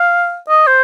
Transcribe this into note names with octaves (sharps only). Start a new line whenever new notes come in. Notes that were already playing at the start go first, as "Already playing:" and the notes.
Already playing: F5
D#5
C5